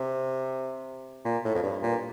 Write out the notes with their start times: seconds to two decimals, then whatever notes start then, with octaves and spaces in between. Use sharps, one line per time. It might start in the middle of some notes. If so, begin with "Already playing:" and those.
Already playing: C3
1.25 A#2
1.44 A2
1.55 F2
1.63 G2
1.82 A#2